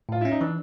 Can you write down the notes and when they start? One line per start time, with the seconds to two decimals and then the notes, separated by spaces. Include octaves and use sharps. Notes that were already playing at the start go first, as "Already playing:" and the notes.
0.09 A2 F4
0.21 C#4 E4
0.31 D#4
0.40 E3 D4